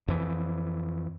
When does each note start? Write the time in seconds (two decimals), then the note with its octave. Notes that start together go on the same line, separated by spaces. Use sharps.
0.08 F2 E3